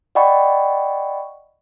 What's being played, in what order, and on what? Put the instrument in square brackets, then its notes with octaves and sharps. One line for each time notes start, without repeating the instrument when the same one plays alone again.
[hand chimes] D5 D#5 F#5 G5 B5 C#6